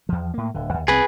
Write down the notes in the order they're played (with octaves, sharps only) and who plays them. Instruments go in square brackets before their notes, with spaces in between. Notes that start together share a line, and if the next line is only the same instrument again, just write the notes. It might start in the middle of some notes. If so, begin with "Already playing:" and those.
[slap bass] E2 F3
A2 A#3
D1 D3
D#2
[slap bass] C2 C4 [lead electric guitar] G#4 B4